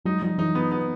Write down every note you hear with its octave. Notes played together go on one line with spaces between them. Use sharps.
F#3 G#3 D#4
F3 G3 D#4
E3 F#3 D#4
B3
B3